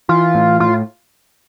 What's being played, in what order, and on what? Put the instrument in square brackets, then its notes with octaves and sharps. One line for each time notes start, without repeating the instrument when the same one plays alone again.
[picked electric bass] E3 [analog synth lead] F4
[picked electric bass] A2
[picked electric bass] A2 [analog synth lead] F4